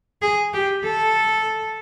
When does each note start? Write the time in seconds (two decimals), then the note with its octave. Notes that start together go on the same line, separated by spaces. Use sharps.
0.22 G#4
0.54 G4
0.84 A4